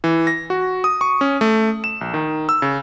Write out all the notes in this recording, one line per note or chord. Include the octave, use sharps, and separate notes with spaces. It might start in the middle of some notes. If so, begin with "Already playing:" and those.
E3
A#6
F#4
D#6
C#6
C#4
A3
E7
A#1
D#3
E6
C#3